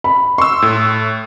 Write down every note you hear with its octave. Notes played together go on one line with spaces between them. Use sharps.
B5
C6 C#6 E6
A2